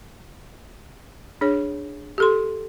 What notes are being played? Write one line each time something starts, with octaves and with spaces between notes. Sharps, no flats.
D4 G#4 C#5
G4 A4 C6